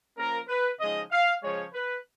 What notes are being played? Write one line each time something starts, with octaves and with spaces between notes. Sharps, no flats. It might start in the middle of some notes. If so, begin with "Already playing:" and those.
F3 A#3 C#4 A#4
B4
C#3 F3 G#3 D#4 D#5
F5
C#3 F3 G#3 C#5
B4